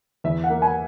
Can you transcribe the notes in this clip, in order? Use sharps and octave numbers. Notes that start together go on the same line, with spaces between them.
E2 E5
F#5
A#3
G#5